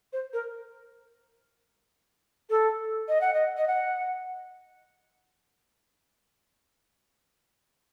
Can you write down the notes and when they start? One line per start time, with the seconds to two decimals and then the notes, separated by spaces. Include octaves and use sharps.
0.13 C5
0.33 A#4
2.50 A4
3.08 D#5
3.21 F#5
3.34 D#5
3.57 D#5
3.67 F#5